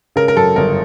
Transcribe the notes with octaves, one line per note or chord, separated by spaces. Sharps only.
C#3 A#4
A#4
F#2 A4
G1 A#4